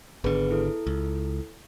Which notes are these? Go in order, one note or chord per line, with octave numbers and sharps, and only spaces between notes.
G#1 D3 B3 G#4 B4
E4 A4
C#2